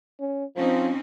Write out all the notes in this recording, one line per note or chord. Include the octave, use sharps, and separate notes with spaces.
C#4
F3 C4 C#4 D#4